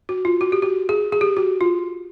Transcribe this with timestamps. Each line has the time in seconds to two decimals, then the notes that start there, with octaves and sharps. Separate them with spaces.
0.09 F#4
0.25 F4
0.41 F#4
0.52 G4
0.62 F#4
0.89 G#4
1.12 G#4
1.21 G4
1.37 F#4
1.61 F4